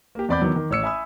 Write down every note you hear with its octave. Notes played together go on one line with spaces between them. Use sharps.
A#3 G4
E2 C4 D5 B5 D6 G6
D#3 E3 F#3 B3
D#3
A1 C#5 E6 C#7
E5 G#5 B5 D#6 E6